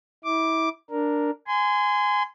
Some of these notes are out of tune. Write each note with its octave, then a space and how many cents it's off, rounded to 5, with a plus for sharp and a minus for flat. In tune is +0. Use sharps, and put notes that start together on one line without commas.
E4 -30 D6 +0
D4 +0 A#4 +0
G#5 +0 C6 -30